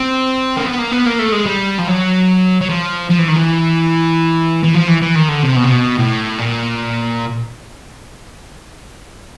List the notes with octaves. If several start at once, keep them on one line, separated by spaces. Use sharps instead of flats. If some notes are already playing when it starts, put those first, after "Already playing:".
Already playing: C4
A#3
B3
A#3
B3
A#3
A3
G#3
G3
F3
F#3
F#3
F3
F3
E3
D#3
E3
E3
F3
E3
E3
D#3
D3
C3
B2
C3
B2
A2
A#2